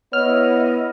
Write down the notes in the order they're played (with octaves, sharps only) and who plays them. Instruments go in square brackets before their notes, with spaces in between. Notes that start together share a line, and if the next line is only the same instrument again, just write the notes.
[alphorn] B3 [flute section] E4 D#5 [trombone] C#5 [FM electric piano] F6